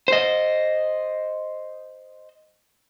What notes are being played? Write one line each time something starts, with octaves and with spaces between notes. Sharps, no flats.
C5 D#5